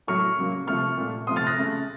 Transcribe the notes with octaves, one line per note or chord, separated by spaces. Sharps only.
A2 F#3 A3 C#6 F6
C#3 F#3 A#3
C3 F3 A3 C#6 F6
A#2 A3
C3 F3 A3 C6 D#6
F6 A6
F#6 A#6
C#3 A3